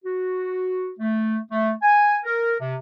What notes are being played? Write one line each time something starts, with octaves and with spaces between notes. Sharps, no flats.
F#4
A3
A3
G#5
A#4
C3